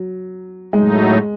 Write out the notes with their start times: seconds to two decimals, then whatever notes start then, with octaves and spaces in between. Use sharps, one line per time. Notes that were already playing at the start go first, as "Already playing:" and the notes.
Already playing: F#3
0.73 A2 F#3 G#3 A3 D#4